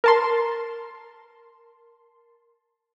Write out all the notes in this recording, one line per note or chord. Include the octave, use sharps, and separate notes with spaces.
A#4 A5 C6